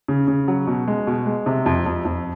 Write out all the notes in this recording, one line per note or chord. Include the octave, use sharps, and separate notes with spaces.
C#3
C#3
F#3
B2
G#3
B2
G#3
C3
F2
F2
F2